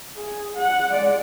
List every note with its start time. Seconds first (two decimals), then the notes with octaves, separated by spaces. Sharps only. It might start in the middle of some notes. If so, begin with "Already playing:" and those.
0.15 G#4
0.56 F#5
0.90 G#3 D5